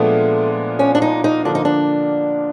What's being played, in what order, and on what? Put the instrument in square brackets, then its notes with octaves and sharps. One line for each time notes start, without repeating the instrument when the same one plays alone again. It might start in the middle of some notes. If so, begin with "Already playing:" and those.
Already playing: [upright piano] A#2 F3 G#3 B3 D4 [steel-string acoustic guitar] A3
[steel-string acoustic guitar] C#4
D4
D#4
D#4
[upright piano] D3 F3 A#3 [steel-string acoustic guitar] D4
[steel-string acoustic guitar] D#4
D4